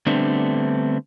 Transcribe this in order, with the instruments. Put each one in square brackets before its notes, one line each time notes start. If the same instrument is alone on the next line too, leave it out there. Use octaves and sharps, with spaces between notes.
[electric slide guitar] D3 G3 A3 B3 C4 D4